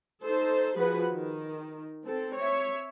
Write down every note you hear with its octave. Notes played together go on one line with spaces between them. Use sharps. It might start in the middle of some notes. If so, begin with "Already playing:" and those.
D#4 A4 C5
F3 F#4 G#4 B4 F#5
D#3
C4 A4
C#5 E5